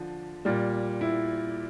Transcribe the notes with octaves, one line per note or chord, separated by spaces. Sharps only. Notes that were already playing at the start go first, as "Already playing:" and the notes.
Already playing: D3 F3
A#2 G3
E4